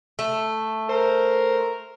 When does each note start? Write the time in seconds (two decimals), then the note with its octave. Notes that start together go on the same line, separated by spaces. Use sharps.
0.19 A3
0.89 A#4 C5